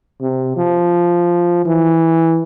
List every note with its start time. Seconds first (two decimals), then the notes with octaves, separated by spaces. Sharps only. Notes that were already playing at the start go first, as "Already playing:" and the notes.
0.21 C3
0.57 F3
1.65 E3